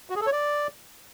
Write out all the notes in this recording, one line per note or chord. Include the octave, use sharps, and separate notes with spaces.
F#4
G#4
A4
C#5
D5